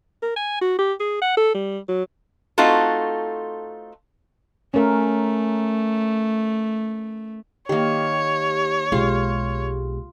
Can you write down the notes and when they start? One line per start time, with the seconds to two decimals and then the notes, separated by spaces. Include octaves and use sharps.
0.22 A#4
0.36 G#5
0.61 F#4
0.79 G4
1.00 G#4
1.22 F#5
1.37 A4
1.54 G3
1.88 F#3
2.58 A3 C4 D#4 F4 F#4 A4
4.74 A3 C#4 A#4
7.69 D#3 A#3 G4 C#5
8.92 B1 G#3 F4 G4